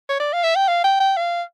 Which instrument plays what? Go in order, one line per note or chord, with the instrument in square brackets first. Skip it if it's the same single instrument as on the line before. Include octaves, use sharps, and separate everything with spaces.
[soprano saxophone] C#5
D5
F5
E5
G5
F5
G5
G5
F5